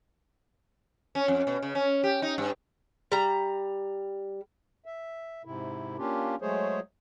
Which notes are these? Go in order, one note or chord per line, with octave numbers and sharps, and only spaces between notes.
C#4
F2
B2
C#3
C#4
G4
D#4
G2
G3 A#5
E5
G#2 C3 E4
A#3 C#4 D4 F4 G4
F#3 G#3 A3 G#4 C5 C#5